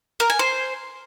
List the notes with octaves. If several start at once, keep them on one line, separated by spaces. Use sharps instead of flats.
A#4
G#5
C5